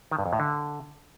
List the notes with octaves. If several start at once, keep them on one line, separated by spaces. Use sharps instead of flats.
D#3
G2
F2
A2
D3